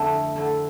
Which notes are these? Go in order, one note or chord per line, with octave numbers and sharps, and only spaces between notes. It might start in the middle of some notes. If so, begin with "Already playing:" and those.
Already playing: F2 D3 A3 E4
F2 D3 A3 E4